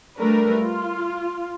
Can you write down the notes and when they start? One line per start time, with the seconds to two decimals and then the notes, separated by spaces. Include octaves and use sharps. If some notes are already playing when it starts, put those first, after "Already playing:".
0.18 G3 A3 D4 A#4 B4
0.59 F4